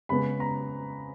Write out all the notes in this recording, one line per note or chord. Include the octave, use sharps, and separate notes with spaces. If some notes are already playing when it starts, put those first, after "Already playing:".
C#3 G#3 B3 B5
A#5